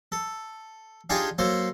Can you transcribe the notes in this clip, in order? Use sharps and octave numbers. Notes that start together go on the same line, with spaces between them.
A4
D4 D#4 F4 G4 G#4 A5
F#3 A#3 A4 C5